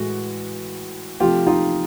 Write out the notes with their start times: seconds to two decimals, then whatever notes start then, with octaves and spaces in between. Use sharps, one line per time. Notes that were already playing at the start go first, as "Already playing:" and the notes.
Already playing: A2 E3 G#3 F#4
1.20 C3 F3 A3 F4 G4
1.47 D#4 F4